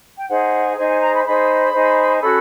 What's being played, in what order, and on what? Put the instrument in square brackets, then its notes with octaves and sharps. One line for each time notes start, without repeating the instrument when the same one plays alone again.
[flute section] G5
D#4 G#4 C5 F#5
D#4 G#4 C5 G#5
G#5
A#5
B5
D#4 G#4 C5 B5
D#4 G#4 C5
C#4 F#4 A4 B5